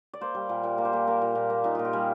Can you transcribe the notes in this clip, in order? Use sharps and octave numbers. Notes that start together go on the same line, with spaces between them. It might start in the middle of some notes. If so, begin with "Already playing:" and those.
D5
A#3 C5
G3
A#2
A#2 D5
A#3
C5
A#2
A#3 A#4
A#2
A#2
A#3
A#2 D#4
A#2 F4
G4
G3 G#4